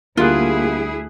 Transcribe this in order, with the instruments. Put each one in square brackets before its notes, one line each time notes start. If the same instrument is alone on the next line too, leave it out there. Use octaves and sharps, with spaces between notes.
[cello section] D2 E4 G#4 [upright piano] D3 G3 F#6 [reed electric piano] A#3 [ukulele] F4